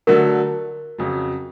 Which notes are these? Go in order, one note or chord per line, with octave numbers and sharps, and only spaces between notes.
D3 F#3 A3 D4 A#4
F2 C#3 F#3